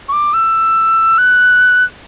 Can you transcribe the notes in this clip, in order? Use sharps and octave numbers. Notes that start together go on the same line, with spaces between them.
C#6
D6
E6
F#6